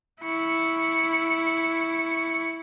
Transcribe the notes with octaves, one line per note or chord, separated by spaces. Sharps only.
E4 C#6